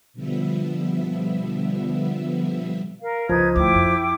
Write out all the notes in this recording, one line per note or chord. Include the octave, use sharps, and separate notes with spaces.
B2 D3 F3 G3 B3 E5
A#4 F5
C#2 F3 D#4 B4 G#6
D2 E4 G5 D6
F2